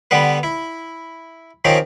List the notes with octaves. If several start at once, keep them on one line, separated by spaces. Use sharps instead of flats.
D3 G3 B3 B4
E4
D#3 F3 C4 C#4 G4